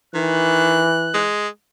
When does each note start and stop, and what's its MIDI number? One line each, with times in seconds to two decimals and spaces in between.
0.15 0.92 51
0.15 1.33 52
0.15 1.24 90
1.14 1.48 56